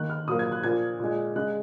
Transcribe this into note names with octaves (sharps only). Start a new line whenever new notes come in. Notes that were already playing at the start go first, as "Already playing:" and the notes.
Already playing: D#3 A#3 F#6
F6
A#2 F#3 A#3 D#6
G#6
F#6
A#2 F3 A#3 G#6
A#2 G#3
C#3 G#3 F#6